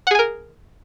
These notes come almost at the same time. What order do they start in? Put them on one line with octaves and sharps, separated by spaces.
F#5 G#4 G#5 A#4